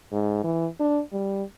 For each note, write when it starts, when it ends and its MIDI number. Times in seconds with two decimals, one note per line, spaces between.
0.12 0.40 44
0.44 0.67 52
0.80 1.02 62
1.12 1.43 55